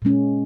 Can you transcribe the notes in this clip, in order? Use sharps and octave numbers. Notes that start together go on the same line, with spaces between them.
A#2 G#3 C#4